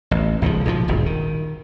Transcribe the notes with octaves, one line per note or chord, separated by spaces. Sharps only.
A1
G#1 C#2 D3 F3
B1 A#2 D3 F3
D#1 G#1 G2 B2
D#3